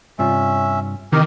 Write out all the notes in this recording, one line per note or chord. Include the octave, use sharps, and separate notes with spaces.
G2 C3 C#4 F4 E5
C3 D#3 E3 G4 A#4